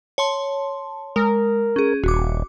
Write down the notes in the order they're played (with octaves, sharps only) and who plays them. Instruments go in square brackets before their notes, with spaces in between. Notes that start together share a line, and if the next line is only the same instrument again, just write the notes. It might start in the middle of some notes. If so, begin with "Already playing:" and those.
[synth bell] C#5 A5 C6
[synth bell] G#3 [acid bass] A#4
[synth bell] C#4 G#4
[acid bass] D#1 [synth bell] F#4 D6